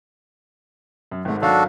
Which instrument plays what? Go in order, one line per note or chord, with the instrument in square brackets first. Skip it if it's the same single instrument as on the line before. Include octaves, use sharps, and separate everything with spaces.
[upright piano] F#2
[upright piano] G#1 G#2 [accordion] A3
[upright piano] G#1 F#3 F5 [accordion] D4 F#4 A4